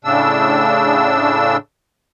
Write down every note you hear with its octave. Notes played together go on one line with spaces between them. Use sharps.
A2 C#3 D4 E6